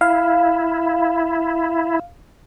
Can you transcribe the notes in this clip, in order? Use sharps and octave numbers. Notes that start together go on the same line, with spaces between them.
E4 F5